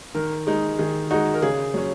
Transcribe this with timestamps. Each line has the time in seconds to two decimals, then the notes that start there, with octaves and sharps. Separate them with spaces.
0.15 D#3 A#4
0.47 G#3 D#4
0.79 D#3 G#4
1.11 G#3 D#4 F#4
1.34 A#4
1.42 C#3 G#4
1.74 F#3 C#4